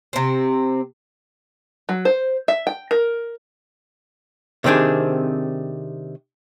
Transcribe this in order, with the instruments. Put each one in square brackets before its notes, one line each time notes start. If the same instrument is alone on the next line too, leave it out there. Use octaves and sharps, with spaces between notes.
[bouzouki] C3 C4
[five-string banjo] F#3
C5
E5
G5
A#4
[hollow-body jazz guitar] C3 D#3 C4 D4 G#4